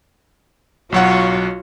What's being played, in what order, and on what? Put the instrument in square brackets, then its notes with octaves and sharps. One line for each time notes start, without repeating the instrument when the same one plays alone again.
[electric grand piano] B1 F#3 F#5 [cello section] F4 F#4 C#5